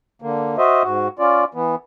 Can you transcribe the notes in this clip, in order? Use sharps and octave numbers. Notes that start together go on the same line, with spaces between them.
D3 A#3
F#4 C5 D#5 E5
G#2 F#4
C#4 F4 D5
E3 B3